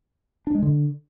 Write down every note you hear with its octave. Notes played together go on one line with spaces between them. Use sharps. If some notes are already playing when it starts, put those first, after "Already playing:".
D4
G#3
D3